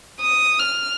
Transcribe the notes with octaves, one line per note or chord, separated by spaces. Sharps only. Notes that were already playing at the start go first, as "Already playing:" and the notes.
D#6
F6